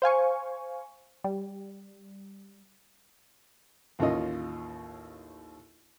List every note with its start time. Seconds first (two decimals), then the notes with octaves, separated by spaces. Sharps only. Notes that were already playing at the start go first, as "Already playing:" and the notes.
0.02 C5 F5 G#5 C#6
1.24 G3
3.99 A1 D#2 C#4 F4 D#5